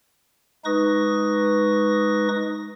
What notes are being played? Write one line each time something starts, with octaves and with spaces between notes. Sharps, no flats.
G#3 D#4 B4 C#6 D#6 A#6